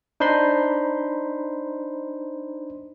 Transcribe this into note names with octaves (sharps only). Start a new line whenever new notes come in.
D4 D#4 C5 B5 C6